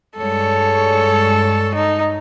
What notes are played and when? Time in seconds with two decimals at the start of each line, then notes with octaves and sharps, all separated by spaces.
0.18 G2 G#3 A4 C#5
1.75 D#4